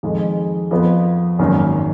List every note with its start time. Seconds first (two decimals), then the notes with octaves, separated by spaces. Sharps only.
0.03 F2 D#3 G#3
0.71 F2 F3 B3
1.39 G#1 F#2 D#3 A#3